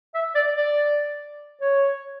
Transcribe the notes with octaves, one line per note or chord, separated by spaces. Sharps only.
E5
D5
D5
C#5